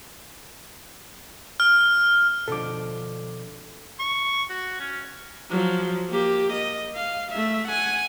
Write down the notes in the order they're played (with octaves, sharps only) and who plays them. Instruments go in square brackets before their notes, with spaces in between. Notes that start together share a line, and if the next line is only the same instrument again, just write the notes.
[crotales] F6
[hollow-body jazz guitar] B2 D3 F3 [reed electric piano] A4 D6
[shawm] C#6
F#4
C#4
[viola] F3 F#3
A#3 G4
D#5
F5
A3 E5
F#5 G#5